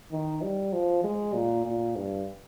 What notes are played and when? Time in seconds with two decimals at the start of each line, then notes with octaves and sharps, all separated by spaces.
0.11 D#3
0.42 G3
0.73 F3
1.04 G#3
1.34 A#2
1.66 A#2
1.96 G2